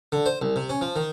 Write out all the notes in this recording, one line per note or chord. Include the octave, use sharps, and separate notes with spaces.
D3
C5
C2
C3
C#4
F3
D#3